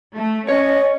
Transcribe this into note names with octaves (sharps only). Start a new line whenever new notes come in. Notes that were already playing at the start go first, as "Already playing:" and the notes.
A3
C#4 C#5 D#5